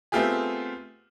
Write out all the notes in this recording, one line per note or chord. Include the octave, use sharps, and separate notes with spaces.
A3 B3 C4 F4 G4 G#4